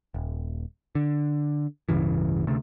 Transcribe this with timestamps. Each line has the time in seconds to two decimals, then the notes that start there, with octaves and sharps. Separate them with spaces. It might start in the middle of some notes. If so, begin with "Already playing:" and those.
0.14 D#1
0.95 D3
1.89 D1 G2 C#3 E3
2.47 D2 C3 A3